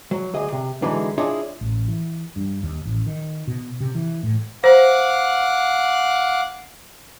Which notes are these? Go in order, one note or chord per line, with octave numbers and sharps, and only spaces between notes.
F#3
D2 G#4 D#5
C3
D3 E3 F#3 G#3 D#4
D4 E4 F4 G#4 C#5 D#5
A1
E3
G2
D#2
A1
D#3
B2
C3
E3
A2
C5 F5 F#5 D6